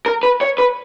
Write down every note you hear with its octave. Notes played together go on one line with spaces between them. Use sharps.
A#4
B4
C#5
B4